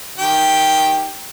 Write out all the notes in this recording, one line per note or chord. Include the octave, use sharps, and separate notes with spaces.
D#3 G4 G5